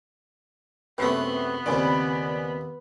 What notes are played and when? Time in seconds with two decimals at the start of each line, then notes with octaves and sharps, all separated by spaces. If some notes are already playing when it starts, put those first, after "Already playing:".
0.98 F#2 C3 A3 B3 B4 G5
1.66 D#2 A#2 C#3 A#3 C4 D5 G#5 B5